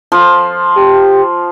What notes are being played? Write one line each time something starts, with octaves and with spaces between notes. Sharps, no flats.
F3
G4